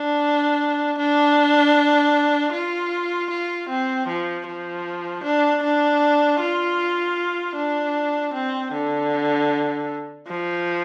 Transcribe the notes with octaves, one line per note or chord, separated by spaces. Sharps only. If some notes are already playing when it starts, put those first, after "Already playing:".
Already playing: D4
D4
F4
F4
C4
F3
F3
D4
D4
F4
D4
C4
D3
F3